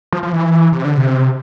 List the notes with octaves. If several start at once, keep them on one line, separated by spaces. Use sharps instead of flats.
F3
F3
E3
C3
D3
C3